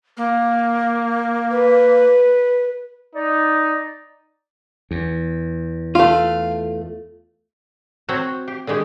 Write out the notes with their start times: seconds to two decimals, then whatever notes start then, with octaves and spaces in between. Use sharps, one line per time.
0.17 A#3
1.51 B4
3.15 D#4 D5
4.91 E2
5.95 A3 F4 F5
8.09 C4 F#4 C5 C#5 F#5 A#5
8.48 G4
8.67 D3 D#3 G#3 G4